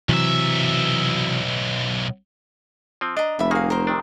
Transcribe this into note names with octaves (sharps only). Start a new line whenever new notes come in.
B1 C3 E3 F#3 E5
F3 C4
D4 D#5 A#5
F1 E5 B5
D#3 A#3 F#4 G#4 F5
A#4 C5
C3 D#3 D4